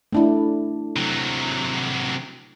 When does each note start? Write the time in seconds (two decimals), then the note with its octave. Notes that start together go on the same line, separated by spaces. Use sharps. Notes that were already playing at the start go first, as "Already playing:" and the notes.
0.12 A3 D4 E4
0.96 C3 F#3